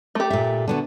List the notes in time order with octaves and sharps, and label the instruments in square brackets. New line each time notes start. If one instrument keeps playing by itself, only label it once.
[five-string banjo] A3 G4
[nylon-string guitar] A#2 E5
D3 B3 F#4